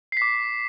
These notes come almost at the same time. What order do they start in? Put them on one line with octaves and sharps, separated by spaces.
C7 B6 D6